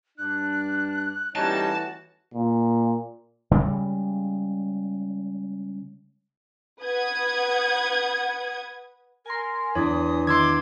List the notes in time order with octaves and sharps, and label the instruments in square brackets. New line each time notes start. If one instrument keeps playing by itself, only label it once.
[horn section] G2 D4 [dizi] F#6
[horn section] E3 A3 F#4 [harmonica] G3 C#4 D#4 [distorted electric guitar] A5
[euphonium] A#2
[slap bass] C#3 G3 G#3
[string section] B4 F#5 D#6 G#6
[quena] A#4 [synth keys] G#5 C6
[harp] E2 D4 [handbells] C#5 [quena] D#6
[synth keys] D#3 E3 [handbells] C6 E6 G#6 [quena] D6